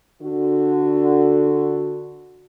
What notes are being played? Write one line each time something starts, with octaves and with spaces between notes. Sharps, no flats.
D3 F#4